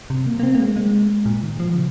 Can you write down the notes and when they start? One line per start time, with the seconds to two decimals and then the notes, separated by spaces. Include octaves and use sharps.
0.10 C3
0.26 A#3
0.39 A#3
0.43 C4
0.55 A#3
0.60 G#3
0.76 G#3
1.26 A#2
1.43 D#3
1.60 F3
1.76 C#3